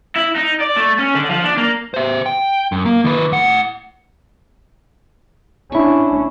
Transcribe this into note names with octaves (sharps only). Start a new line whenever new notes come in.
E4
D#4
D5
A3
C#4
D3
F3
D4
A#3
C5 E5
G5
F#2
A#3
D#3 B4
A2 F#5
C#4 D4 E4 C#6